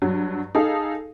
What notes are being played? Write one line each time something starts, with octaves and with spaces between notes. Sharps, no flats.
G2 F#3
D#4 G#4 A4 F5